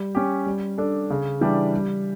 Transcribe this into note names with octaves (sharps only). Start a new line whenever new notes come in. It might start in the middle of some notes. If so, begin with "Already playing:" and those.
Already playing: G3
C#4 G4
G3
D4 A4
C#3
E3 G3 D4 G4
G3